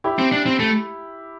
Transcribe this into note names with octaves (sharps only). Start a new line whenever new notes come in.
E4 G4
C4
D4
C4
A3